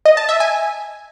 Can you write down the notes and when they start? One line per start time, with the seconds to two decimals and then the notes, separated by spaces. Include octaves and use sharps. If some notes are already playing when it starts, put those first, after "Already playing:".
0.05 D#5
0.17 A5
0.29 E5
0.40 G#5